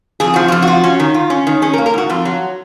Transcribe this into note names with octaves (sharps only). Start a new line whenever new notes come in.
F2 G#4
F3 F#4
F2 F4
F#4
F4
C#4
D#3
F4
C#4
D#3
C#4 G#4
A#4
A#3
A#4
G#2 F#4
F2 F4
F#3